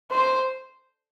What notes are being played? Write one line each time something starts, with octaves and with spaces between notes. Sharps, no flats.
C5